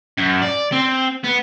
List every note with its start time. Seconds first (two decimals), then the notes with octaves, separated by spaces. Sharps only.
0.18 F#2
0.42 D5
0.72 C4
1.24 B3